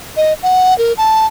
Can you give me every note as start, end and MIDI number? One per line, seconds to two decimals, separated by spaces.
0.17 0.33 75
0.43 0.76 78
0.78 0.93 70
0.98 1.26 81